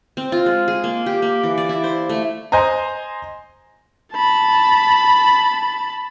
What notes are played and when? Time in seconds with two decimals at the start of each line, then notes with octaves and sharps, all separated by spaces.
0.17 C4
0.32 F4
0.46 G#3
0.68 G#4
0.84 A#3
1.06 G4
1.22 A#3
1.43 E3
1.58 D5
1.69 E4
1.84 C5
2.09 A3
2.52 C5 D#5 G#5 A#5
4.14 A5 B5